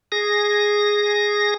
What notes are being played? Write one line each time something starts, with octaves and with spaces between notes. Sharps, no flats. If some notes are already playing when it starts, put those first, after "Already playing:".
G#4 A#6